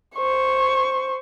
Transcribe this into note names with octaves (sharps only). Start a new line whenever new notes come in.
C5 C#6